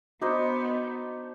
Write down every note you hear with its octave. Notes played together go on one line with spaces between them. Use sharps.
B3 D4 D#4 F#4 C5 D#5